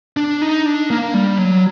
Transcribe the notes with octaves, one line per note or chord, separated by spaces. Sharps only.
D4
D#4
D4
A#3
G3
F#3